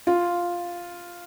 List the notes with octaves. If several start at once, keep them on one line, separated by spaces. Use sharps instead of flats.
F4